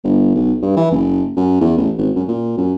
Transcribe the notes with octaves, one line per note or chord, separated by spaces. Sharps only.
G1
B1
G2
E3
F#1
F#2
E2
A1
G#1
F#2
A#2
F#2